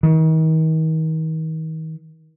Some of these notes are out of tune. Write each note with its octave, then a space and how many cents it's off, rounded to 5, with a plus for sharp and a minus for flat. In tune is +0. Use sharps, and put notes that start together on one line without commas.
D#3 +40